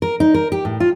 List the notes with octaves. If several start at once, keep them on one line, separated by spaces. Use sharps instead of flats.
A#4
D#4
A#4
G4
A2
F4